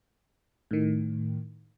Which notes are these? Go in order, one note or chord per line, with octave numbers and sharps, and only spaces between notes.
A2 D#3